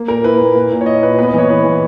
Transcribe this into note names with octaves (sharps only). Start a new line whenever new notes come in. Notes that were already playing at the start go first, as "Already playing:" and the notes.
Already playing: A#3
A#2 A#4
E4 B4
A#2
A#3
A#2
C#5
E4 D#5
A#2 B4
B3 B4
D#5
E3 C#5
E4 B4
E3